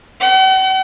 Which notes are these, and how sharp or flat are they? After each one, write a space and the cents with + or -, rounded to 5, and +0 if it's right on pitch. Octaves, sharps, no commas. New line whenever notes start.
F#5 +45